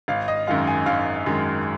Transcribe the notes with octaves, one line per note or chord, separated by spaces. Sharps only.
G#1 F5
D#5
F#2 D#3 G#3 F5
G#5
G#1 F5
F#2 D#3 G#3